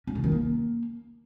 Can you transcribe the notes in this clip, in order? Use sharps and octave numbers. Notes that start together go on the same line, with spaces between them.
C#4
D3
D#3
A#3